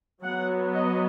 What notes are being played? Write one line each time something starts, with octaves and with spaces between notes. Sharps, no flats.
F#3 B3 F#5
D#5